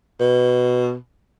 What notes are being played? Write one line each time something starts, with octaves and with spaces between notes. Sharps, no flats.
B2